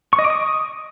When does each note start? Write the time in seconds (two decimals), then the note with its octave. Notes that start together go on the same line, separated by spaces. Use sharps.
0.13 C#6
0.19 D#5
0.24 D6
0.30 D#6